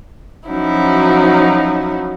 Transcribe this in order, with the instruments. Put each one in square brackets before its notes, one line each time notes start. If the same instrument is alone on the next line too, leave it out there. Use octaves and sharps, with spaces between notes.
[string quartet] F3 F#3 C#4 D#4 E4 F#4